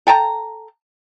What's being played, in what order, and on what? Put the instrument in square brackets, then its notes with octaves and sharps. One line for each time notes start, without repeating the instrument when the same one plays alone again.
[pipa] A4 G5 A5 A#5